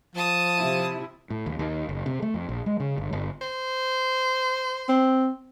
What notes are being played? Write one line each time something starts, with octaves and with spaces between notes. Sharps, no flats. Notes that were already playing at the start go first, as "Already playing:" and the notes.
F3 A5 D#6
C3 E4
A2
D#2
D#2
F#1
C3
A3
F2
A#1
G#3
C#3
G1
G1
C5
C4